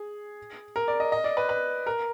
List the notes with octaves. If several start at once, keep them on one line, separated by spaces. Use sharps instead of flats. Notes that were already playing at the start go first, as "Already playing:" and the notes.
Already playing: G#4
A#4
D5
D#5
D#5
D5
B4
B4
A#4